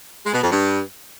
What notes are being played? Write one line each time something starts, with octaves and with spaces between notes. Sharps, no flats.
G#3
B2
F2
G2